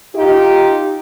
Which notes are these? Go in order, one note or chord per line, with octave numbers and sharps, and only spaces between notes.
D#4 F4 G4